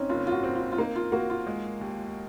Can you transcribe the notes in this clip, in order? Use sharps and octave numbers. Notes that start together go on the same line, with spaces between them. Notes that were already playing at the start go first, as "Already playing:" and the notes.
Already playing: C4 C#4 D#4
F#1 F4
F4
F#4
C4
F4
F4
A#3 D#4
F4
A#3 F#4
F4
G#3
D#2